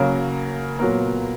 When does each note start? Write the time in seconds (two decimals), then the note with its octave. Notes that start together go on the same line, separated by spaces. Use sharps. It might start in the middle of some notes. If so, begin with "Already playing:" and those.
Already playing: C#3 F#3 A#3 A#4
0.79 A#2 F#3 B3 A#4